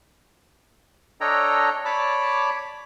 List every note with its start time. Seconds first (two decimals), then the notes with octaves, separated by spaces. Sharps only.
1.21 D4 A4 C#5 D#5 G5 A#5
1.85 C#5 D5 A5 B5 D6